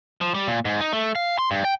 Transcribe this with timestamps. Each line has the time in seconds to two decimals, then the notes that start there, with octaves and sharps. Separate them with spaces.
0.21 F3
0.35 G3
0.48 A#2
0.65 G#2
0.81 D#4
0.93 A3
1.15 F5
1.39 C6
1.51 G2
1.65 G5